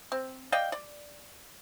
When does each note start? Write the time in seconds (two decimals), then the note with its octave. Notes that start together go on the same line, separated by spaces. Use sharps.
0.12 C4
0.52 D5 D#5 F5 G5
0.72 D5